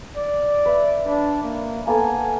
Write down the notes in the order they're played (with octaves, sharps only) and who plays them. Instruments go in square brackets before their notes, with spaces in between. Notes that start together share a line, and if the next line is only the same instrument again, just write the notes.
[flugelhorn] D5
[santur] B4 E5
[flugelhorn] D4 [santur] B5
[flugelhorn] A#3
[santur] A#3 B3 A4 [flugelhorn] G#5